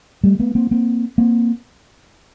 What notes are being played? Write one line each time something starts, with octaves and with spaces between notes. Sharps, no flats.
G3 A3
A3 B3
A#3 C4
A#3 C4
A#3 C4